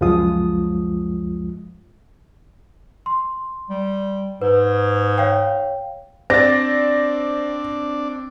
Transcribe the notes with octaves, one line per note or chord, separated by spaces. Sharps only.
C#2 F#2 F3 G#3 F4 D#6
C6
G3
G#2 B4
C#5 F5 G5
C4 D4 D5 A6 A#6